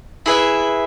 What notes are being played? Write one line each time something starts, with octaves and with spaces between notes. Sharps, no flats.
E4 G#4 B4 E5